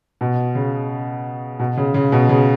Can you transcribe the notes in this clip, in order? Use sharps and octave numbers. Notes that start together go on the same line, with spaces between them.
B2
C#3
B2
C#3
C#3
B2
C#3